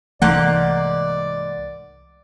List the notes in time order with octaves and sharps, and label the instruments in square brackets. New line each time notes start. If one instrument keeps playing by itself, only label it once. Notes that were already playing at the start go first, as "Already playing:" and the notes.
[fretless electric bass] C2 E3 A3 [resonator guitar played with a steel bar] G#2 A#3 F#5 [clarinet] D5